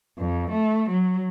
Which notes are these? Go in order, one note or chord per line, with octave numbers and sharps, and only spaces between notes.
F2
A3
F#3